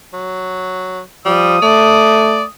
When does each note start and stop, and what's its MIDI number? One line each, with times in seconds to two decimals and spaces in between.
0.14 1.02 54
1.25 1.61 53
1.25 1.58 55
1.25 2.49 87
1.62 2.45 57
1.62 2.43 74